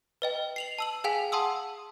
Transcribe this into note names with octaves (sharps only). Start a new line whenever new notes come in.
B4 D#5 G5
C7 F7 F#7
A5 E6 F#7
G#4 F5 G5 G#5 B6 F7
F#5 A5 C6 D#6 E6